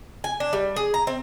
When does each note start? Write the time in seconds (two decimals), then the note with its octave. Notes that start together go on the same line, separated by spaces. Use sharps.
0.24 G#5
0.40 D4
0.53 G3
0.76 G#4
0.94 A#5
1.07 C4